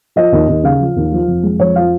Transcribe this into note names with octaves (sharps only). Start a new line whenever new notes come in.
F3 D#5
D#2
D#2
C#3 F5
F3
D#2
F3
F1
G#3
F2 C#5
F3 F5